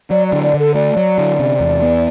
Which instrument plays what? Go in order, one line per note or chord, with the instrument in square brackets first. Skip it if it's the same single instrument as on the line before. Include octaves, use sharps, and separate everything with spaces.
[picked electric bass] F#3 [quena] D5
[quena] D5
[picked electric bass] D3
[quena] D5
[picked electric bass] D3
[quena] A4
[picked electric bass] A3 [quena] D5
[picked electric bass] F#3
D3
C3
E2
B3